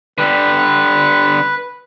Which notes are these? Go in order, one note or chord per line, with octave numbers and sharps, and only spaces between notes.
D3 G3 B4